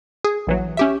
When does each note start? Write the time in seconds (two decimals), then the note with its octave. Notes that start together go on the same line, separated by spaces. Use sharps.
0.24 G#4
0.47 A#1 E3 F#3
0.77 C#4 G4 E5